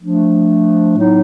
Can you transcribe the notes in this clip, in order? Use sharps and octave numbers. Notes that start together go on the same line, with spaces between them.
F3 A3 D4
A2 F#3 B3 D#4